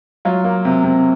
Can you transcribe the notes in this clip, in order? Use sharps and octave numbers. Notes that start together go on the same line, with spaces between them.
F#3 F4
A#3
C3
C3